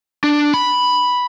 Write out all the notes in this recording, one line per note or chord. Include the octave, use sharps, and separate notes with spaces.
D4
B5